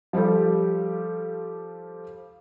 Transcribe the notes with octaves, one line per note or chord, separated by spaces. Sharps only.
F3 G3 F4 G4 A4